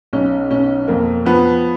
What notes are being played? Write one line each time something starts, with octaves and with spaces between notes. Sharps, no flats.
B1 C#4
B2 C#4
F2 A#3
F3 B3